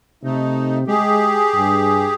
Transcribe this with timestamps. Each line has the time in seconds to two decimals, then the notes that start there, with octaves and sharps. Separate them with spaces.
0.24 C3 A3 D#4
0.88 G#3 G4 G#4
1.56 G2